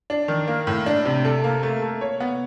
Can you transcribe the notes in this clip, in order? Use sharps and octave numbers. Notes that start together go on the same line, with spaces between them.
D4
D#3
A#3
A2
D4
C3
A4
A#3
A3
A3
C#5
B3